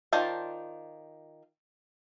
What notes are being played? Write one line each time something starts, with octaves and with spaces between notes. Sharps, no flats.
D#3 F4 C5 D5 A5